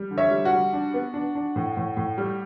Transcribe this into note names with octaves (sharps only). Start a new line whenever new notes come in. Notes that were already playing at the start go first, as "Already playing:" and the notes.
Already playing: G3
D3
C#5 E5
G3
F#4
G3
D4
B3
D4
D4
A2
A2
A2
G3